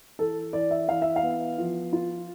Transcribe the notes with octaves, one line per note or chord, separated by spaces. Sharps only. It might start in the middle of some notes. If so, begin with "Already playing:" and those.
E3 A4
E3 D5
E5
E3 F5
E5
F5
B3
F3
F4